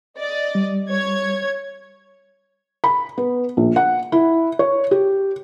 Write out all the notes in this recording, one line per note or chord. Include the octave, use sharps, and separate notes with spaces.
D5 D#5
G3
C#5 G#6
B5
B3
A#1
F#5
E4
C#5
G4